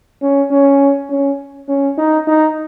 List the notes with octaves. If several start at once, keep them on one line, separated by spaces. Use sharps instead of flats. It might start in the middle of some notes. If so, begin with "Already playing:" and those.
C#4
C#4
C#4
C#4
D#4
D#4